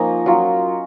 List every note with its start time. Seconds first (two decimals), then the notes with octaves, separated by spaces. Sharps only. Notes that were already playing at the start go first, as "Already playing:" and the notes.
Already playing: F3 A#3 C#4 D#4 G#5
0.26 F#3 C#4 F4